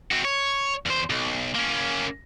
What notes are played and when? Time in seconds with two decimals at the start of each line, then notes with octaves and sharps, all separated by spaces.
0.12 C4 F#4
0.25 C#5
0.86 E2 C5
1.10 B1
1.55 A#3 C#4